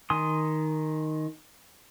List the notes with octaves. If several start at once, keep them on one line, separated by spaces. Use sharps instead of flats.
D#3 G#5 C6 D#6